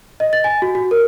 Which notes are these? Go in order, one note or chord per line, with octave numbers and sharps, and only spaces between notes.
D#5
A6
G#5
F#4
F#4
A#4